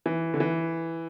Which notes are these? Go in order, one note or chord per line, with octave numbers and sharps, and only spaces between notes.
E3
D3
E3